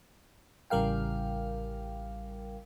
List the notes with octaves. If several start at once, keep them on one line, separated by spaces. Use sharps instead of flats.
A1 C#3 G3 A#4 F5 G5